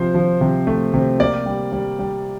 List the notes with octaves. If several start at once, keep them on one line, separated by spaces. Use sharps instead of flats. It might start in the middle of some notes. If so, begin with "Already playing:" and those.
Already playing: C3 F3 C5
F3
C3
A3
C3
A#3 D5
G3
G3
G3